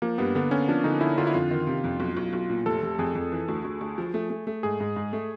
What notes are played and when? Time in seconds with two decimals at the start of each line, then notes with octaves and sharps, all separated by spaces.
0.02 F3 A#3
0.18 G2 B3
0.35 D3 B3
0.51 D3 C#4
0.68 F3 D4
0.84 D3 D#4
1.01 D3 E4
1.18 D3 F4
1.27 E4
1.34 F2 F4
1.51 D#3
1.67 C3
1.84 F2
2.00 B1
2.17 B1
2.33 B1
2.50 A#2
2.66 F1 A4
2.82 F1
2.99 F2 G#4
3.15 F2
3.32 E3
3.48 D2
3.64 D2
3.81 D2
3.98 F3
4.14 A3
4.30 A3
4.47 A3
4.63 G#2 G#4
4.80 G#2
4.96 G#2
5.13 A3